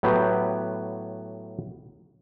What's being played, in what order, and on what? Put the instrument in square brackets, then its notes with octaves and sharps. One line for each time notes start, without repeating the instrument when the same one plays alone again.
[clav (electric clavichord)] A2 F#3 B3 G4 B4 G5